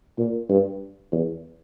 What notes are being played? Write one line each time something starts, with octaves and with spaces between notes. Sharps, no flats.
A#2
G2
E2